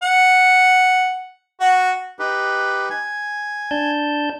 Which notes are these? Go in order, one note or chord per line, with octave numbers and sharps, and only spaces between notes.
F#5
F#4
D#4 G4 B4
G#5
D4 A5 G6